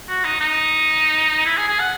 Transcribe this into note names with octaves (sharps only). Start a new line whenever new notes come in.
F#4
D#4
D#4
E4
G#4
G#4
F#5